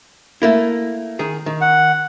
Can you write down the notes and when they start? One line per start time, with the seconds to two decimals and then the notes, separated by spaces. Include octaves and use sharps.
0.42 A3 A#3 E4
1.19 D#3 G#4
1.46 D#3
1.61 F#5